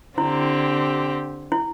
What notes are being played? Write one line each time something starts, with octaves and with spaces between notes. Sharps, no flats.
D3 C4 E4 G4
E4